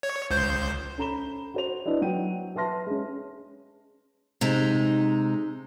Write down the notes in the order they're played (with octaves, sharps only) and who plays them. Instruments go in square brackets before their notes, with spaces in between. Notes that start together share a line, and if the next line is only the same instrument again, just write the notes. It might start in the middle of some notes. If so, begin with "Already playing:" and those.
[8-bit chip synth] C#5
C#2 C5 G6
[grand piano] C#4 A4 A#5 B5 E7 G7
F#4 C5 F7
D4 E4 B4 D5 D#5
F#3 F#5 G5 D#7
B4 E5 A5 C6 F6 A#6
G#3 C#4
[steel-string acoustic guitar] C3 G#3 D#4